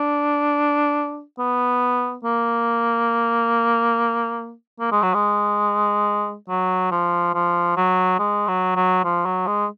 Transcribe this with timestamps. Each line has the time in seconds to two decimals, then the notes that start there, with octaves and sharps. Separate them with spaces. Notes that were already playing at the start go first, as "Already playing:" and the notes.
Already playing: D4
1.39 B3
2.24 A#3
4.80 A#3
4.92 G#3
5.02 F#3
5.14 G#3
6.49 F#3
6.91 F3
7.34 F3
7.77 F#3
8.19 G#3
8.48 F#3
8.76 F#3
9.05 F3
9.25 F#3
9.47 G#3